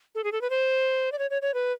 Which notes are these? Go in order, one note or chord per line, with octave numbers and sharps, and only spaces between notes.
A4
G#4
A4
B4
C5
D5
C#5
C#5
C#5
B4